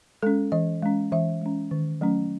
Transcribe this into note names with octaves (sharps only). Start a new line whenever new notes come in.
G#3 C#4 A4
E3 D#5
G#3 C#4
E3 E5
G#3 C#4
D#3
F#3 A3 C#4